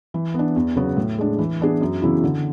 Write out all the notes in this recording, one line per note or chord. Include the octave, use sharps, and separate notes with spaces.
E3
B3 D4
E2
C#3 F#3 B3 F#4
A2
G#3 D4
E3
B3 D4 G#4
F#2
C#3 E3 B3 E4
D3